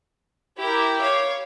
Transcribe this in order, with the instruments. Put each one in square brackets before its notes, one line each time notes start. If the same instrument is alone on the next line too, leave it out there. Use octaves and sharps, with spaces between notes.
[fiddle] E4 A#4 [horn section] G4
[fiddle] C#5 F5